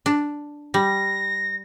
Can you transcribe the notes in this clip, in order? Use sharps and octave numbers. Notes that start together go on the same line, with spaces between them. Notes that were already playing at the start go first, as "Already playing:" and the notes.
D4
G3 A#6